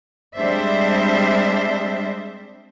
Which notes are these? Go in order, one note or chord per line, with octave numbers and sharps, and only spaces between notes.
G3 G#3 C4 D4 C5 E5